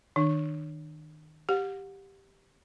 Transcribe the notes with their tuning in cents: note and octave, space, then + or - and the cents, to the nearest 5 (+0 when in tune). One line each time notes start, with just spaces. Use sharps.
D#3 +0 D4 +30
G4 +0 F#5 -35